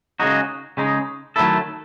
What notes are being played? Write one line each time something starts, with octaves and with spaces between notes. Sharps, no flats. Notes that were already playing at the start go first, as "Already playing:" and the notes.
C#3 G#3 D#4 F#4
C#3 G#3 D#4
D#3 F#3 A3 E4 A4